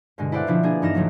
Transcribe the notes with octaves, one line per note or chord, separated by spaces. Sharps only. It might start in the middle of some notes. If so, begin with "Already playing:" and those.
G2 B2 D3 G#3
E4 A4 C5 D5 F5 F#5
B2 D3 F3 D4 E4
A#3 D4 G#4
G2 E3 D#4 F6 A#6 E7
B1 D#3 F3 F#3 A3